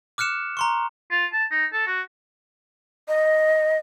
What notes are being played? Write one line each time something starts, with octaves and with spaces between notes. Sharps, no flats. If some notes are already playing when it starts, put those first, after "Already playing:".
D6 F6 F#6 C#7 E7
A#5 C6 C#6
F4
A5
D#4
A4
F#4
D#5